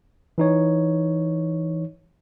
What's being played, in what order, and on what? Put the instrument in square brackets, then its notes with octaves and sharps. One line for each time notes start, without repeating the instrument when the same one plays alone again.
[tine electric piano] E3 D#4 C#5